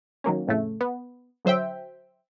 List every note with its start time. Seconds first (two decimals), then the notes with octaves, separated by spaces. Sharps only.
0.24 D#3 F#3 A#3 C#4
0.47 F2 A2 C#3 A3
0.81 B3
1.45 D3 F#3 C5 E5 G5